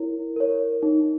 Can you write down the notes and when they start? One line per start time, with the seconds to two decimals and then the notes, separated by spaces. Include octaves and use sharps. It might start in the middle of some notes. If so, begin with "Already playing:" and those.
Already playing: E4 A#4 C#5
0.36 A#4 C#5
0.83 D#4